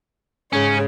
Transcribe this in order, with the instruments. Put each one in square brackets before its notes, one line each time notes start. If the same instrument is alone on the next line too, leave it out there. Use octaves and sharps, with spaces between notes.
[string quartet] G#2 C#3 C#5 [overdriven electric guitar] C#4